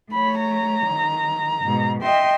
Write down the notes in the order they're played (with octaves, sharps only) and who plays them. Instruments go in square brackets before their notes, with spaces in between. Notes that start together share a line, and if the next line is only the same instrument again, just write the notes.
[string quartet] A3 C#5 [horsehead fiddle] B5
[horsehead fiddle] A#5
[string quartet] D#3
G#2 B2
[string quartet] D#5 E5 C6 [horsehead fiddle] G5